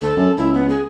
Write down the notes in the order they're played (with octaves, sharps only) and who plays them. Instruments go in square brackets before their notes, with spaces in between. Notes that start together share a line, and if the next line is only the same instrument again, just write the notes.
[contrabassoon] D2 [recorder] A4
[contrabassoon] F#2
[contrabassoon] C#2 [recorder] E4
[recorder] B3
G#4